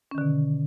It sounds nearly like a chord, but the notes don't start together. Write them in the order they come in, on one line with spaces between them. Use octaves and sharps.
C#4 D#3 D3 B2